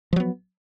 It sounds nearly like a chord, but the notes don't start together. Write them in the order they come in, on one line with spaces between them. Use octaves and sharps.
F3 F#3 B3